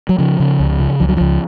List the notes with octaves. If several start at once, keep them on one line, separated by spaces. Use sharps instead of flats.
F#3
C#3 F3
C#3
C#2
C#3
C#2 F3
F#3
C#2 F3